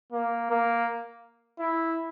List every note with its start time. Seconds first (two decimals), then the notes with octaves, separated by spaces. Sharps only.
0.13 A#3
0.50 A#3
1.59 E4